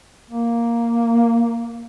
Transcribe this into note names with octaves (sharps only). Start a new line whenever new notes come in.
A#3